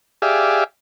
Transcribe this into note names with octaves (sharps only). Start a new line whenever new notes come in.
G4 G#4 D5 E5 F5